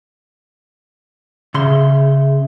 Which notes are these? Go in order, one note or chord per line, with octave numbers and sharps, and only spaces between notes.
C#3 G#4 E5 C6